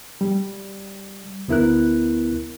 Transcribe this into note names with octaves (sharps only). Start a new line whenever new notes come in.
G3
D2 B3 E4 A#4 F#6